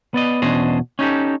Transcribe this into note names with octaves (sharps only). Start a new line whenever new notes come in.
B3 D5 D#5
E2 B2 C#4 D4 C5 D#5
C#4 D#4 G4 A4